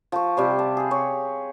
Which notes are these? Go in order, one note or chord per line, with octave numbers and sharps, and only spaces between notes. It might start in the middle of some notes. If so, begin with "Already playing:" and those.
F3 C#6
C3 G3 C5
A5
G4 G#4
C#5